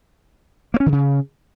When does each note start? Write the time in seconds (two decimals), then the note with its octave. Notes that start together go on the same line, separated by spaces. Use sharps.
0.74 A#3
0.80 C#4
0.86 D#3
0.92 C#3